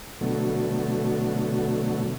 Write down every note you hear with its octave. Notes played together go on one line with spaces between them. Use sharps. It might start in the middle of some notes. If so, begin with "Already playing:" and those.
B2 D3 F#3 A3